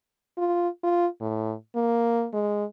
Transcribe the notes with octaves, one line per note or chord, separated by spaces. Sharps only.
F4
F4
A2
A#3
G#3